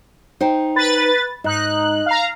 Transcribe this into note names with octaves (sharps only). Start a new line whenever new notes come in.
D#4 C5 G5
B4 A6
G#2 D#4 F#6
F5 A#5